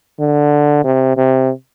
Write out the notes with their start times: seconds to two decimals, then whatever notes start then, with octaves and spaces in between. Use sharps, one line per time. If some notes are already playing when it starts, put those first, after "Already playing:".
0.20 D3
0.84 C3
1.17 C3